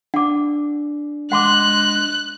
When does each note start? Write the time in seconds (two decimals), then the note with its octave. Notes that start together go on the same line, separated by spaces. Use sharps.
0.14 D4 F#5 D6
1.32 G#3 F#5 C6 D6 F#6